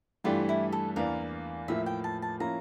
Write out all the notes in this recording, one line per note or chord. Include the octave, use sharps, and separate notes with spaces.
G2 E3 A3 D4 F4 G4
E4
A4
E2 E3 A#3 D4 A#4
A2 F3 A#3 E5
G5
A5
A5
F3 A#3 C#4 E4 A#5